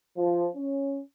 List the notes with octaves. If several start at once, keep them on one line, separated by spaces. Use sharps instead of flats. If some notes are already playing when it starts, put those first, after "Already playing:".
F3
C#4